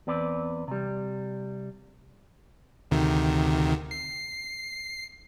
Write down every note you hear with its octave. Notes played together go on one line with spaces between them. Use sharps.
E2 C4 B4 D5
C3 G3
D2 C3 D#3
C7